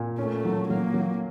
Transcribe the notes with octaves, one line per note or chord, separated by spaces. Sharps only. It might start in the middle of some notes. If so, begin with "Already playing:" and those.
Already playing: A#2
A3 C#4
F#3
F#3 A#3
F#3